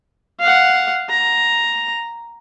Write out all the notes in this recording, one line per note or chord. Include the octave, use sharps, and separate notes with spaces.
F5 F#5
A#5